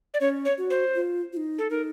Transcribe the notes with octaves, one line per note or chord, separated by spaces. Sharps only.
D5
C#4 C#5
C#5
F#4
C5
F4
F4
D#4
A4
D#4 A#4